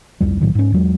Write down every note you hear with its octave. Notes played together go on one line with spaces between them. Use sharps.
G1 C2 F2 G3
B1 A2 D#3 F#3
G#2 C#4
E2 F#3 G#3